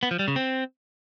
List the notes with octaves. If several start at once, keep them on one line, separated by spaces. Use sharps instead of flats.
B3
F3
G3
C#3
C4